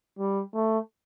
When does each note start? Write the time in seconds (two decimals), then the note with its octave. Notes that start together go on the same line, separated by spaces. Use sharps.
0.19 G3
0.54 A3